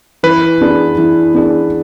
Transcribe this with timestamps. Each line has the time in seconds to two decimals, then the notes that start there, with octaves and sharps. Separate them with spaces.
0.23 E3 B4
0.61 B3 D4 G#4
0.98 E3
1.34 B3 D4 G#4